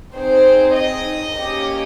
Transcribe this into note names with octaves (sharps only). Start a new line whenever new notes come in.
C4 D#4 G#4 C5
D#5
A#3 C#4 G4